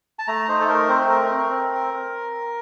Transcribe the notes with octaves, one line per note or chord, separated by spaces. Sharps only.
A5
A3 A#5
D#4 C5
A4
A3 A#4
C4 C5
A3 A#4
C4
C4